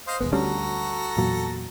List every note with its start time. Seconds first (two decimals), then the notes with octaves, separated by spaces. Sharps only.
0.07 C5 D#5 F5
0.20 D#1 F2 G#3 B3
0.32 D2 G3 C#4 F#4 A4 A#5
1.17 E2 A#2 F#3